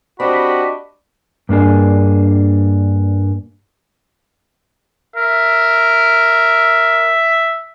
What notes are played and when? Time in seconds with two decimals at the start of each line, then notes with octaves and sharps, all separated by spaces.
0.20 C4 D4 F#4 G4 D#5 B5
1.49 G2 A#3 D4 G#4
5.16 A#4 E5